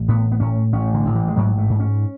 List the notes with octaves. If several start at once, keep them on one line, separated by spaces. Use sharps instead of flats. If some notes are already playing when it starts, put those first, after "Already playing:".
Already playing: A1
A2 B3
B3
A2 C#4
A1 C#4
D3
A1
E3
G#3
G#2 F#3
A3
G#2
C#4